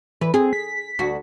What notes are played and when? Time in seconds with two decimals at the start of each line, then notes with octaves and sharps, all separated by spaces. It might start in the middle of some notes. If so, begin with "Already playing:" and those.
0.21 E3 B4
0.34 C4 G#4
0.53 B6
0.99 D2 F#4